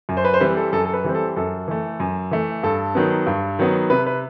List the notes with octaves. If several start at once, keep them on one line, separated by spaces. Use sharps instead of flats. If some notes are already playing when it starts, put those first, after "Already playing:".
F#2
C5
B4
C5
E3 G3 C4 B4
A4
F#2 A4
A4
B4
E3 G3 C4
A4
F#2 A4
E3 A3
F#2
E3 A3
G2 A4
D#3 F#3 B3
G2
D#3 F#3 B3
C3 B4
B4